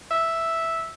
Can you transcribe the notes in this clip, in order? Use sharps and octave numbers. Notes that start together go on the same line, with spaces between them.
E5